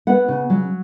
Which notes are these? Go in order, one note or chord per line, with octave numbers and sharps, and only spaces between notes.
B3 F#5
C#3
F#3